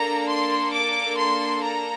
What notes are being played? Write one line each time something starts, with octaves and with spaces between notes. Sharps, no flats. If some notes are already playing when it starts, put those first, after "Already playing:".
Already playing: A#3 D4 A4 A#5
C6
D6
C6
A#5